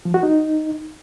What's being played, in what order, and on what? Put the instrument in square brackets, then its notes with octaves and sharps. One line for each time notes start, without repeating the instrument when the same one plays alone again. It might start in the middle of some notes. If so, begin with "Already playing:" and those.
[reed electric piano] F3
F#4
D#4